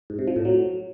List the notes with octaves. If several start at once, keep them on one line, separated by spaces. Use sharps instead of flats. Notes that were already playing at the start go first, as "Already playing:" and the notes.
G#2
C3
F3
A2
F#3